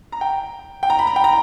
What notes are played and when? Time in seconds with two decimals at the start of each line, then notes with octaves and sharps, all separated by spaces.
0.12 A#5
0.21 G5
0.83 G5
0.90 A#5
0.99 B5
1.07 A#5
1.16 G5
1.24 A#5